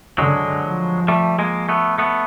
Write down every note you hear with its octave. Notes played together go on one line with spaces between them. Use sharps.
D3 F#3 G#3
F3
G3 A3
G#3 A#3
A3 B3
A3 B3